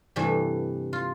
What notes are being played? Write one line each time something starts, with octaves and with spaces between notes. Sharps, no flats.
G2 C3 E3 A3
F4